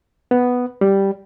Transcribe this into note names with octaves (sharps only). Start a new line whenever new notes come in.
B3
G3